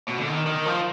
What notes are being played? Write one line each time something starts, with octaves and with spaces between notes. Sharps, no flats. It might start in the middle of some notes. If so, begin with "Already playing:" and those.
B2
D3
D#3
D#3
F3